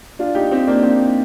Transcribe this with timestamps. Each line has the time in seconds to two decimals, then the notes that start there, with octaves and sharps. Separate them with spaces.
0.19 D4 F4
0.35 D#4 G4
0.51 C4 D#4
0.67 A#3 D4
0.83 C4 D#4